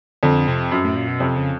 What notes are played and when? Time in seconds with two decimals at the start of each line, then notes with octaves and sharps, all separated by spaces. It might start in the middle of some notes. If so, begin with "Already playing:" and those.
0.23 F2 D3
0.48 C3
0.72 F#2
0.84 A2
0.96 A#2
1.08 B2
1.20 F2 C3
1.36 C#3